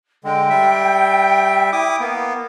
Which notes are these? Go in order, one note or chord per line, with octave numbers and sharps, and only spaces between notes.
D3 G#3 G5
G3 E5
E4 D6 D#6
A#3 B3